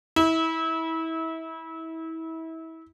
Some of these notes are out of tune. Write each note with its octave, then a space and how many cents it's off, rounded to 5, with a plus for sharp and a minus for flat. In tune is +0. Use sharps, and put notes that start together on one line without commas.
E4 -30